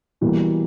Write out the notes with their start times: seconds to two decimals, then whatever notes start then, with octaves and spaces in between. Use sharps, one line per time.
0.21 B2 E3 G3 A#3